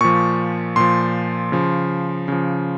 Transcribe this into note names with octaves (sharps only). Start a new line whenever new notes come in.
A#2 F3 C#6
A#2 F3 C6
C#3 F3
C#3 F3